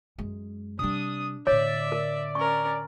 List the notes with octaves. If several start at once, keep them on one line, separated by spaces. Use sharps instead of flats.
F#2 G#3
C3 G3 D4 D#6
A2 D3 C#5 D5 E5
A#4
C#4 A#4 C#6